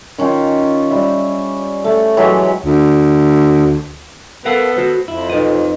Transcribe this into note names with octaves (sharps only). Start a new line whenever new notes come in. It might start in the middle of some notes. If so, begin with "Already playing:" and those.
D#3 C#4 D#4 F4
G3 E5
A3
E3 F#3 G#3 G4
D2
B3 A4 A#4 F5 F#5
F#4 C5
F2 E4
D#4 B4 D#5